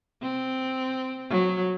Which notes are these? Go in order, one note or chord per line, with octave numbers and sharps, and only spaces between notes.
C4
F#3